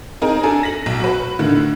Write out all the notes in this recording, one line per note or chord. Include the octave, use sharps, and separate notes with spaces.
C4 D#4 G#4 A#4
D4 A4 G#5
A#6 B6 F#7
B1
F#4 B4
A2 D3 D#3 A3